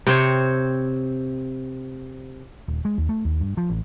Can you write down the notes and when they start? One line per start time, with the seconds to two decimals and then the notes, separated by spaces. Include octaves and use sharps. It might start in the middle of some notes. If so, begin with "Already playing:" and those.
0.07 C3 C4 C5 C#5
2.68 D#1
2.85 G#3
2.98 D#2
3.09 A3
3.25 D#2
3.40 G2
3.57 F3
3.70 A1